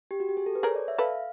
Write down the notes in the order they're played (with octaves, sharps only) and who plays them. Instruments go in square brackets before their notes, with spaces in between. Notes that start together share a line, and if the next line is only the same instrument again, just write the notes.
[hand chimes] G4
F#4
G4
G#4
A4
B4
[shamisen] G#4 A#4 [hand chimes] C#5
[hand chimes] D5
E5
[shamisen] A4 B4 [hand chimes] F5